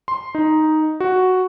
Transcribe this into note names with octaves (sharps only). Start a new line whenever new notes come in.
C6
D#4
F#4